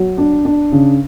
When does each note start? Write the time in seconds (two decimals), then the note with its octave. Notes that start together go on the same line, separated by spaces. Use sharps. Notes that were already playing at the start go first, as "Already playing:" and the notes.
Already playing: F#3
0.18 D4
0.45 D4
0.72 C#3